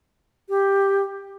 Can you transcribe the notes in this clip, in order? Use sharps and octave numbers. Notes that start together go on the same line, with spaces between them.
G4